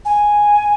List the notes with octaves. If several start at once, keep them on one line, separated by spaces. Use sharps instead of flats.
G#5